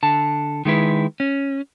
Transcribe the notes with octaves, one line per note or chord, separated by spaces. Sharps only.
D3 A5
D#3 G#3 E4 B4
C#4